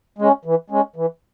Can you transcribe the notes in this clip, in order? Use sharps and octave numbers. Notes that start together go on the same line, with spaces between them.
G#3 C#4
E3
G#3 C#4
E3